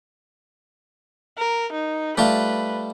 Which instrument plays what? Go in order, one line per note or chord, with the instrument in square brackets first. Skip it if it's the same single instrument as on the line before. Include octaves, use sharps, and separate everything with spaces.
[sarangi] A#4
D#4
[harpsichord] G3 A3 F4 [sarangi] B4